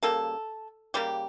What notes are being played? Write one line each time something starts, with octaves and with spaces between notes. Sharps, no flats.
C#3 G3 A#3 A4
C#3 G3 A#3 G4